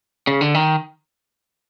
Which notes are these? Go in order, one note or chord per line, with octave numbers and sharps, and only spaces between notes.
C#3
D3
D#3